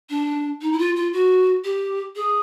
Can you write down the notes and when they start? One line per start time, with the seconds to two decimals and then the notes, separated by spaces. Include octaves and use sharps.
0.10 D4
0.61 D#4
0.72 E4
0.79 F4
0.96 F4
1.13 F#4
1.64 G4
2.16 G#4